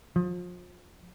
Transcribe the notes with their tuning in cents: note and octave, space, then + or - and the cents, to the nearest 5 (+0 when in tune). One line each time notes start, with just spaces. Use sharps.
F3 +35